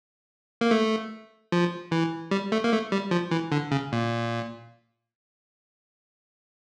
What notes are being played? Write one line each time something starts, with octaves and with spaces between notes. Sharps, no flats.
A#3
A3
F3
E3
G3
A3
A#3
A3
G3
F3
E3
D3
C#3
A#2